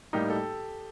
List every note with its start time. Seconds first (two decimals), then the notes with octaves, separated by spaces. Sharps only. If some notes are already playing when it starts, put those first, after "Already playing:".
0.13 A2 G3 A#3 D#4 G4
0.30 A4